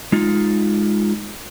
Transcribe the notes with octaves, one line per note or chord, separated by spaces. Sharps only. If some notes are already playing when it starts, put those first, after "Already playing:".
G#3 D#4 F4